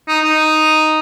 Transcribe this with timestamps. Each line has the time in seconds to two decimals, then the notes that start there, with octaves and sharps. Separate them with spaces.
0.08 D#4
0.24 D#4